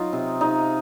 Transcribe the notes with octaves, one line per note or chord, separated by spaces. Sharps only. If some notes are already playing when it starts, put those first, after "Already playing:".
Already playing: F#3 D#4 F4
C3
C3 D#4